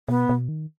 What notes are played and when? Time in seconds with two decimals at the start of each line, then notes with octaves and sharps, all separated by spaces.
0.08 B2 B3
0.29 B2
0.49 D#3